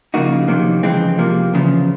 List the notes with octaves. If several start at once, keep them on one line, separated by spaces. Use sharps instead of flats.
C#3 F3 A#3 D#4 F#4
F2 C3 D#3 F#3 A#3
F2 C#3 E3 G#3 C4
C3 F3 A#3
E2 C#3 F3